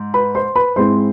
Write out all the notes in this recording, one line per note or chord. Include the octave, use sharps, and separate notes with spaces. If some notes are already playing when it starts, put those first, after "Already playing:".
Already playing: G#2
B4 B5
C5 C6
B4 B5
G#2 G#3 C4 E4 C5 C6